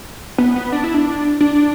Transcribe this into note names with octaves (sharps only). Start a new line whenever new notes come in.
B3
B3
D4
E4
D4
D4